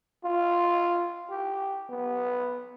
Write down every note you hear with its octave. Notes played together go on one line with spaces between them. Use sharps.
F4
G4
B3